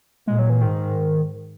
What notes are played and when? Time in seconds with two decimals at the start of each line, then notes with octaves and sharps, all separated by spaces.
0.27 A#2 G#3
0.39 F#3
0.50 E3
0.61 G#2 D#3